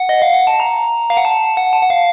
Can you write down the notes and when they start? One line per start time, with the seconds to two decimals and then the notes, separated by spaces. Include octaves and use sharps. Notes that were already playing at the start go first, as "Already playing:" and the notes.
Already playing: F#5
0.09 D#5
0.22 F5
0.34 F#5
0.47 A5
0.60 A#5
1.10 F5
1.17 F#5
1.25 A5
1.57 F#5
1.73 A5
1.82 F#5
1.90 F5